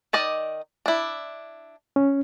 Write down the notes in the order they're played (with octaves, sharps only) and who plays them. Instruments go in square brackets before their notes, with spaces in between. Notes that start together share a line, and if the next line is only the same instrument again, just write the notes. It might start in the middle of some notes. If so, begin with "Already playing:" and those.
[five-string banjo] D#3 D5 D#5
D4 E4
[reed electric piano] C#4